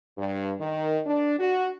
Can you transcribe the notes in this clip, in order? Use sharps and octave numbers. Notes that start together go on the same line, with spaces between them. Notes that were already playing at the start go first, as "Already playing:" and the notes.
G2
D#3
D4
F#4